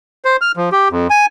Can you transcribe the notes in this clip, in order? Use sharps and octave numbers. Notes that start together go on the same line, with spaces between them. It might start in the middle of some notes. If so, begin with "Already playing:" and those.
C5
F6
F3
G4
F2
G#5